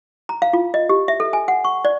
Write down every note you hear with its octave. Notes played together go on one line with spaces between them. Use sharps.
A#5
F5
F4
D#5
G4
E5
A4
G#5
F#5
C#6
D5